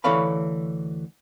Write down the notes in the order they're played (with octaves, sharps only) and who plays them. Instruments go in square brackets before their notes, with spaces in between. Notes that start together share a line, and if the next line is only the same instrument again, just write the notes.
[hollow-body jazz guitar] D2 E3 A4 C#5 F5 B5